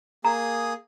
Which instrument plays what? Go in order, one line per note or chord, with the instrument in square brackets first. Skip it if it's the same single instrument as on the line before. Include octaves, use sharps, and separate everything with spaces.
[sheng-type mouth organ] A#3 G#4 D#6 [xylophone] A#5